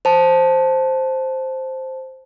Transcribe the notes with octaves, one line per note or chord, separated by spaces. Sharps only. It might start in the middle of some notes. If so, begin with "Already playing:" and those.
C5 A5